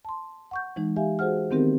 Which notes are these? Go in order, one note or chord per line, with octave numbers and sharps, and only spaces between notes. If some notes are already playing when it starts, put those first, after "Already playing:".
A5 C6
F#5 C#6 G6
E3 G#3 D#4
G4 E5 F5 G#5
F#4 G#4 C5 F#5 F6
D#3 B3 C4 D#4 G4 A#4